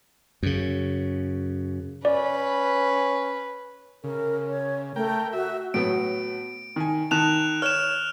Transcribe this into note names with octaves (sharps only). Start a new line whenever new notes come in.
F#2 C#3
C#4 B4 D5
C#3 A#4
C#5
A3 A#4 G5
F#4 E5
A2 F#3 B3 D7
D#3 G#5
D#3 A5 F#6 E7 F7
C#5 F6 E7